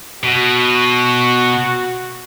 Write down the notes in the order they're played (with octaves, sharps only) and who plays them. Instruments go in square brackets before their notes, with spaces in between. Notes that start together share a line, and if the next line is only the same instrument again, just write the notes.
[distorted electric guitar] B2 [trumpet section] F#4